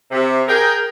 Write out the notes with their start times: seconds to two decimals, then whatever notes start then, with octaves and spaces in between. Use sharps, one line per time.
0.11 C3
0.48 G#4 A#4 G5